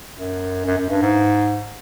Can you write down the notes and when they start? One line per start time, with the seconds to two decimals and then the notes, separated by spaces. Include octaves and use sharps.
0.18 F#2
0.65 F#2
0.78 F#2
0.89 G2
1.02 G#2